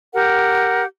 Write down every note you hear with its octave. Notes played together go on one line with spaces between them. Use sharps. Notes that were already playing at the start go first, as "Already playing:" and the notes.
G4 A#4 F#5